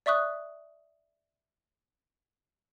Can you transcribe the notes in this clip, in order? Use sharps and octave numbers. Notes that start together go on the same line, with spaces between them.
D5 E5 C#6 D#6 F#6